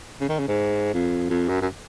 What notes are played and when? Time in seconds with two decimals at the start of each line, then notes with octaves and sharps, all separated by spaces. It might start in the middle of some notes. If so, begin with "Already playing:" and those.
0.21 C#3
0.29 D#3
0.39 C#3
0.48 G#2
0.94 F2
1.30 F2
1.49 F#2
1.62 F#2